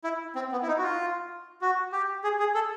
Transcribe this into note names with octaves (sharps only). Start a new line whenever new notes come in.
E4
C4
B3
E4
D#4
F#4
F4
F#4
G4
G#4
G#4
A4